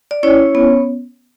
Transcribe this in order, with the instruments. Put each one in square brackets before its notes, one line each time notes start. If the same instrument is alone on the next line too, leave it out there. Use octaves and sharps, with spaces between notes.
[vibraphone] D5
C#4 E4 C#5
B3